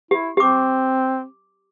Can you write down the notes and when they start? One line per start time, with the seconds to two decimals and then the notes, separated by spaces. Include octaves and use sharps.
0.11 E4 G4
0.37 C4 G4 D6